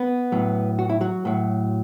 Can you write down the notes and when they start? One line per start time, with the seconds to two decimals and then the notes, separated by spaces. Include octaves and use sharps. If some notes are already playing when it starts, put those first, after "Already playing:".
Already playing: B3 B4
0.32 A2 F#3
0.79 F#4
0.90 E4
1.01 F#3 F#4
1.25 A2 F#3